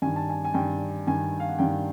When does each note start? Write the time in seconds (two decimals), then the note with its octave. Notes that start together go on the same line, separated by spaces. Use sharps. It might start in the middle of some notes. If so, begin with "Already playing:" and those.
0.02 G2 D#3 G#5
0.16 A5
0.29 G#5
0.45 G#5
0.54 G2 D#3 G5
1.07 G2 D#3 G#5
1.40 F5
1.49 F#5
1.59 G2 D#3 G5